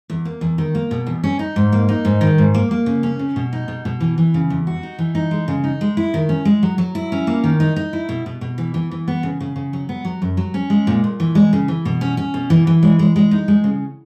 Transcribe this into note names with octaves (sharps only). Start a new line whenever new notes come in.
E2
A#3
E2
D#3
A#3
B2
E2
C#4
D#4
G#2
A#3
D#4
G#2
D#3
G#2
A#3
A#3
C#3
C#4
C#3
B2
D#4
B2
B2
E3
E3
C#3
E2
F#4
D#4
E3
D#4
G#3
C#3
D#4
G#3
E4
D#3
C#4
G#3
F#3
F#3
E4
C#4
A#3
D#3
D#4
D#4
E4
B2
B2
B2
E3
E3
E3
B3
C#3
C#3
C#3
F#3
B3
F#3
F#2
F#3
C#4
G#3
A#2
A#2
E3
G#3
C#3
E3
B2
C#4
C#4
B2
E3
E3
G#3
G#3
G#3
D#4
G#3
C#3